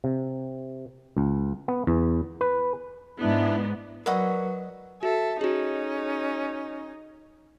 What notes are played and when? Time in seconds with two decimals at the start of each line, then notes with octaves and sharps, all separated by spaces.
0.04 C3
1.17 C#2
1.68 B3
1.87 E2
2.41 B4
3.19 G#2 B3 D4 E4
4.06 F#3 A#4 B4 D5 D#5 F#5 B5 C#6
5.03 F#4 A4 E5
5.41 C#4 D#4 F#4 G#4